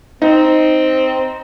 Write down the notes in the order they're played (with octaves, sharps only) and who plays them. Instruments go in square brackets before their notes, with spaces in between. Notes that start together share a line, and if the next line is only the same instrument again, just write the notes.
[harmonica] C4 [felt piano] D#4